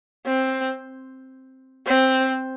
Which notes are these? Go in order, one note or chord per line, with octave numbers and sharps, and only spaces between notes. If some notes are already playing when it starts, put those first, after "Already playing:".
C4
C4